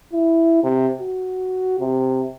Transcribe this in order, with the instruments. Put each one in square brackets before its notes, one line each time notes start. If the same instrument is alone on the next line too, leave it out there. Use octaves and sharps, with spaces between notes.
[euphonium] E4
C3
F#4
C3